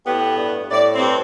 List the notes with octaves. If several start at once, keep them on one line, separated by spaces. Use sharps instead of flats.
A2 B3 G4
G2
A2 D5
G2 C4